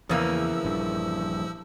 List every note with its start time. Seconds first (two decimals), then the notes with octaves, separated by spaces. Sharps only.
0.09 E2 C#3 E3 F3 A#3 E6
0.65 A#1 G2